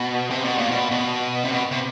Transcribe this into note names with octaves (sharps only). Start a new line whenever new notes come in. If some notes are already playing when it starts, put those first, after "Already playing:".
Already playing: B2
C3
B2
A#2
B2
B2
C3
B2
C3